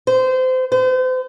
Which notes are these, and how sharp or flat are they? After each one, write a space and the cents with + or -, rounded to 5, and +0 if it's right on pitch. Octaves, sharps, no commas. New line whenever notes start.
C5 -25
C5 -40